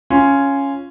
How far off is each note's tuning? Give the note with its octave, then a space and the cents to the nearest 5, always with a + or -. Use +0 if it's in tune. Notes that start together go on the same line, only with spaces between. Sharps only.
C#4 +0 F4 -10